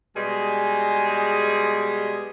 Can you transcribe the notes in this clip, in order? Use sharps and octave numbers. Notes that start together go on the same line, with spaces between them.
B2 G3 G#3 G#4